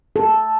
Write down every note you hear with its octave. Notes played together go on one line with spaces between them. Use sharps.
A4